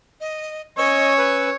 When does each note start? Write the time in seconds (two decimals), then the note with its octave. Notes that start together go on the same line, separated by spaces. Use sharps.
0.21 D#5
0.78 C#4 C#5 D#5 C#6 E6
1.18 B4